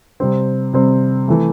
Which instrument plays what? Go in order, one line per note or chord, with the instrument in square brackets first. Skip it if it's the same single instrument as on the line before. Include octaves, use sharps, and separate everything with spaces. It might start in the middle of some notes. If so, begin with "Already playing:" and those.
[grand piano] C3 G3 C4
C3 G3 C4
E3 A3